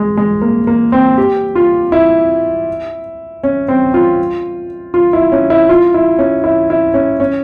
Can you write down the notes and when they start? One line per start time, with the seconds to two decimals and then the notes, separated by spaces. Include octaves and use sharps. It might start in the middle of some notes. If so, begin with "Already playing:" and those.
Already playing: G#3
0.17 G#3
0.42 A#3
0.67 A#3
0.92 C4
1.18 G4
1.55 F4
1.92 E4
3.43 C#4
3.68 C4
3.94 F4
4.94 F4
5.13 E4
5.32 C#4
5.50 E4
5.69 F4
5.94 E4
6.19 C#4
6.44 E4
6.70 E4
6.94 C#4
7.20 C#4